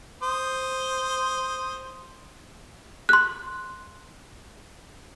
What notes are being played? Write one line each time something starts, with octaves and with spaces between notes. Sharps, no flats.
C5 D#6
C6 F#6